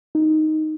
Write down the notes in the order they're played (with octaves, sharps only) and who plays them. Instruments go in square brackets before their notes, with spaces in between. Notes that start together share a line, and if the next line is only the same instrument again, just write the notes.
[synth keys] D#4